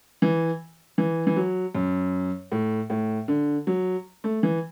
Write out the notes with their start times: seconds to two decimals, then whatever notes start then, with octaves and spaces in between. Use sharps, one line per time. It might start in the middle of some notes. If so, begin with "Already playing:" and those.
0.22 E3
0.98 E3
1.27 E3
1.36 F#3
1.75 F#2
2.52 A2
2.90 A2
3.28 D3
3.67 F#3
4.24 A3
4.43 E3